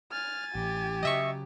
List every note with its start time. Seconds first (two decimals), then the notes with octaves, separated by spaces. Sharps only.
0.12 G#5 F6 A6
0.55 A1 G4
1.03 C#3 F#3 D#5 E5 C#6